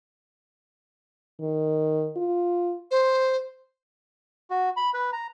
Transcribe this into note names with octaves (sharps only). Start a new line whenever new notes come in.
D#3
F4
C5
F#4
B5
B4
A#5